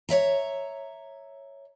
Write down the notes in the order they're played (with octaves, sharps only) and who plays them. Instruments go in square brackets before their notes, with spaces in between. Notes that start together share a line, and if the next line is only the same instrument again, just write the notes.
[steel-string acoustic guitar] C#5 D5 E5 A#5